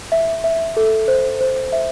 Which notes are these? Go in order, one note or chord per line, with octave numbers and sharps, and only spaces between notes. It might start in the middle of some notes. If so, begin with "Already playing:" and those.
E5
E5
A4
C5
C5
E5